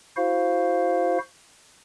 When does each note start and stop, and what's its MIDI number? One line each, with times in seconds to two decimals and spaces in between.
0.17 1.18 64
0.17 1.18 66
0.17 1.18 72
0.17 1.18 77